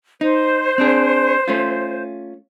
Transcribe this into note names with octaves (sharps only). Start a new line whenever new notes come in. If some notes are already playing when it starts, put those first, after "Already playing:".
D#4 C5
C4 D4 G#4
A3 C#4 F4